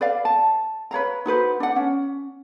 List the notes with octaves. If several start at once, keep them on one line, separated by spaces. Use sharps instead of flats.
B4 D5 F5
A5
B4 C#5 F5 A#5
D#4 F#4 B4 C5
D4 F#5
C#4